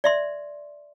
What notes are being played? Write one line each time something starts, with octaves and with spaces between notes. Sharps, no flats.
D5 E5 C6